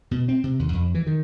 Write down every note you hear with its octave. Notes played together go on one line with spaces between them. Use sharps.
B2
C4
C3
D#2
F2
E3
D#3